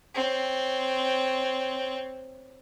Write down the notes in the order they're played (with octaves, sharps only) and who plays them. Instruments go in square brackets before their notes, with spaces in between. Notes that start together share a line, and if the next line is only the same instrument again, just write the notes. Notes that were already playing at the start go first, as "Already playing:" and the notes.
[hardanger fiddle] C4 C#5